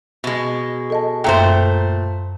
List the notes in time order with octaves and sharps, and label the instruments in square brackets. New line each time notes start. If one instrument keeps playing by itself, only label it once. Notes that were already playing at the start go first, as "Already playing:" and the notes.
[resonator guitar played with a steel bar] B2 G#3
[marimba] A4 D#5 A5
[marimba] F#2 E5 G5 [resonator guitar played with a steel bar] A#2 A3 C5